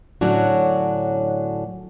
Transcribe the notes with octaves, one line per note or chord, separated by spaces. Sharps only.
A2 D3 F#3 C#4 D4 F#4